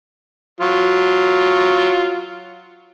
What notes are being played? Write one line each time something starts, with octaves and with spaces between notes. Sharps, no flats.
F#3 F4